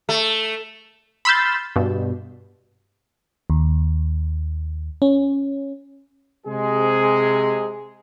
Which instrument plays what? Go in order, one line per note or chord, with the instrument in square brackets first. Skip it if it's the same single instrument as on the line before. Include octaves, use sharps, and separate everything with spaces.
[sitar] A3
[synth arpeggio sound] B5 C6 E6 F6 G6 A6
G2 B2
[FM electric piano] D#2
C#4
[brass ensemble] C3 G#3 G#4